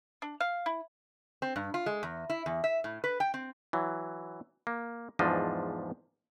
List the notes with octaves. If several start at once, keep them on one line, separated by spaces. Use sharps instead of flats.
D4
F5
E4
C4
G2
F4
G#3
E2
E4
E2
E5
A2
B4
G5
C4
E3 F#3
A#3
E2 G#2 F3 D4 D#5